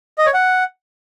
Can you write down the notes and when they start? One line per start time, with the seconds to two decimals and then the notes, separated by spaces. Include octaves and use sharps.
0.18 D#5
0.26 C#5
0.34 F#5